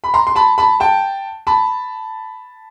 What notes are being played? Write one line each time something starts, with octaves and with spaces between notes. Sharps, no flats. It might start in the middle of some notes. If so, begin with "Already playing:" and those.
B5
A#5 C6
C6
A5 B5
A5 B5
G5 A5
A5 B5